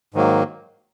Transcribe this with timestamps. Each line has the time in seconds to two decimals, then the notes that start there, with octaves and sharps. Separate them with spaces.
0.14 G#2 D#3 F#3 A#3